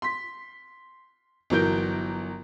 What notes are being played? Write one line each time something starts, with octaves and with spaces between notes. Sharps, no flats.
C6 B6
G1 E3 F#3 A#4 G6 D7